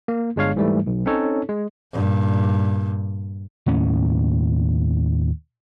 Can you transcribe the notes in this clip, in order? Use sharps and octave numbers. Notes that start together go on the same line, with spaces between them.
A#3
G1 G#3 D4 C#5 F5
G#2 E3 G3 A3
B1
C4 C#4 D#4 A4 C#5
G#3
G2 A#2
D#2 A2 C#4